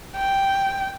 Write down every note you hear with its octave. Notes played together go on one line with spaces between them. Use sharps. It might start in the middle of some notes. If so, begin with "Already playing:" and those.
G5